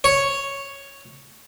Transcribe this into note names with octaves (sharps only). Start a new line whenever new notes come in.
C#5